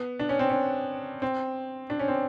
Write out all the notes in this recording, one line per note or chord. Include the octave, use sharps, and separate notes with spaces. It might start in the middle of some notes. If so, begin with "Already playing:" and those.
Already playing: B3
D4
C#4
C4
C#4
C4
D4
C#4
C4